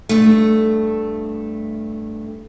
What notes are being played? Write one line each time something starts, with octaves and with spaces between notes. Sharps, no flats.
G2 A3